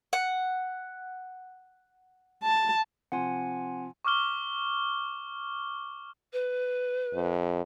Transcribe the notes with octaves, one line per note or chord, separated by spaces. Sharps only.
F#5
A5
C3 F3 F#5 G#5 C6
C#6 D6 F6 G7
B4
F2